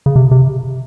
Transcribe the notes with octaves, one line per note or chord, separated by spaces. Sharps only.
C#3
C3
C3